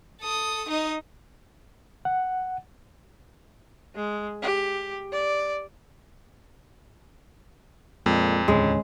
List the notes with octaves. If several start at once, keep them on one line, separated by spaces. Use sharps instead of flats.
A4 D#6
D#4 D#5
F#5
G#3
G4
D5
F2 A#2 G#3
D#2 A2 D3 G#3 C#4